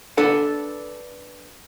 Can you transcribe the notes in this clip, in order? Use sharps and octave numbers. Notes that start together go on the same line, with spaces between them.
D4 A4 B4 F#5